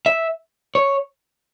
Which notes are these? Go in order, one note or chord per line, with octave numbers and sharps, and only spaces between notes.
E5
C#5